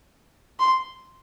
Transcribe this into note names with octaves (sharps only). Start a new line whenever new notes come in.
C6